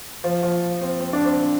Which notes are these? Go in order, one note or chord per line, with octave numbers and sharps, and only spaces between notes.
F3
F3
C4
C4
D4
C4